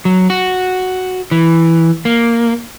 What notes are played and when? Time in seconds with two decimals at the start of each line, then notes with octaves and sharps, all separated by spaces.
0.05 F#3
0.30 F#4
1.31 E3
2.05 A#3